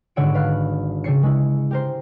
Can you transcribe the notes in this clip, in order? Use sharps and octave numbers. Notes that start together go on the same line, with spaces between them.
G#1 D3 C#5 F#5 E6 D7
B4 F5 B5 F#6
C#3 G4 A4 C#5 C7 C#7
G#3 E4
G4 A#4 C5